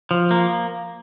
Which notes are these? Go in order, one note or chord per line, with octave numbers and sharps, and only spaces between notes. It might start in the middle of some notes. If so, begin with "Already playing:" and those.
F3
A#3